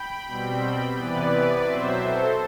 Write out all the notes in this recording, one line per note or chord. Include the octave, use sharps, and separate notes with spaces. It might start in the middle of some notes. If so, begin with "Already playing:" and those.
Already playing: G5 B5
B2 G3 C4
C3 E3 B3 B4 D5
B2 F#3 C4 C5 E5
A4 C5